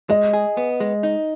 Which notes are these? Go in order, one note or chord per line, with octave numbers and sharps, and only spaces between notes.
G#3 D#5
G#4
B3
G#3
D#4